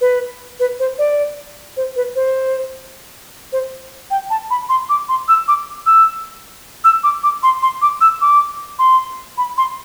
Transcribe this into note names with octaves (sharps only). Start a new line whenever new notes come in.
B4
B4
C5
D5
C5
B4
C5
C5
G5
A5
B5
C6
D6
C6
E6
D6
E6
E6
D6
D6
C6
C6
D6
E6
D6
C6
B5
C6